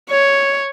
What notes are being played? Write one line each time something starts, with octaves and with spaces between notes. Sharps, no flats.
C#5